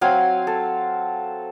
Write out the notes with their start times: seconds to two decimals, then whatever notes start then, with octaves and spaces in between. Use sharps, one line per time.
0.01 F#3 C4 F5 G#5
0.47 A4